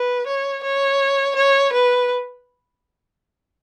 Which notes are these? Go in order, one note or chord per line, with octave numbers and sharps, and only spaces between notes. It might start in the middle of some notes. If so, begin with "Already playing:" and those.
Already playing: B4
C#5
C#5
C#5
B4